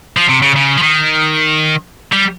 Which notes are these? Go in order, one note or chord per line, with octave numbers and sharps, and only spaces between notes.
F3
C3
C#3
C#3
F3
D#3
G3